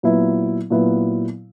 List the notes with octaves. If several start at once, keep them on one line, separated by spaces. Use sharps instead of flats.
A#2 F#3 B3 E4
A#2 F#3 B3 E4